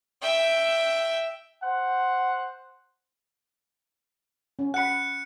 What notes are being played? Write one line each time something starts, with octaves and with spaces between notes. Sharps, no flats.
E5 G5
C5 F#5
C#4
F#5 B5 F#6 C#7